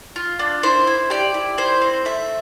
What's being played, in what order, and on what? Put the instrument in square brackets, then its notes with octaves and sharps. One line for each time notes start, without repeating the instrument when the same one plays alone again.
[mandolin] F4
D4
E4 C5
E4
G4 D5
E4
E4 C5
C4
A3 E5